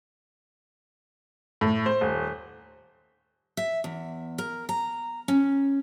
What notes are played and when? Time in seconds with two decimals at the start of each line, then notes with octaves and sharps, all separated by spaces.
1.61 A2
1.86 C5
2.01 D#1
3.57 E5
3.84 E2
4.38 A#4
4.69 A#5
5.28 C#4